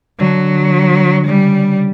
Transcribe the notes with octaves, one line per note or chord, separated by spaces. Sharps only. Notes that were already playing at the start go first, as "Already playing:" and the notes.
D3 F#3
C#3 G3